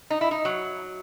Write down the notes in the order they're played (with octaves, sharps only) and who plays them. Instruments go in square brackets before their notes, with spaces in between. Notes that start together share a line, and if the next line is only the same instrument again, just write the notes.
[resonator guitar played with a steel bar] D#4
E4
D#4
F#3